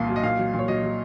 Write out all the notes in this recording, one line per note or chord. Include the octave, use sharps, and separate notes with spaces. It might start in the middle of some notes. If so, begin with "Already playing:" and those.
Already playing: C2 A#2 F5
F#3
D#5
A#2 F5
F#3
A#2
C#5
F#3 D#5
F#3